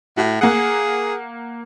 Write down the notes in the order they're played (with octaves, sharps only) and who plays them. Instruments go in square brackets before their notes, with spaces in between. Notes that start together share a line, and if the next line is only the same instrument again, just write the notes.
[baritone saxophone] A2 [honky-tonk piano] F#4
[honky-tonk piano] A#3 F#5 [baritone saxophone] G#4